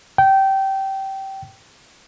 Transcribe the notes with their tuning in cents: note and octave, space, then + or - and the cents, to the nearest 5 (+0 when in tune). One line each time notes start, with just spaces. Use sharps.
G5 -20